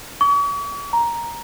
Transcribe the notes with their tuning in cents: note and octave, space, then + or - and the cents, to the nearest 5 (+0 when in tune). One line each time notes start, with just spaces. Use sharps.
C#6 +45
A#5 +5